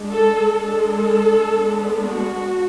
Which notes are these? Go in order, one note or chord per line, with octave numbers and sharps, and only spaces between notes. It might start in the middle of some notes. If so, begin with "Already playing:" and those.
Already playing: G#3 D4
A4
G#3 D4 A4
G#3 B3 D4
F#4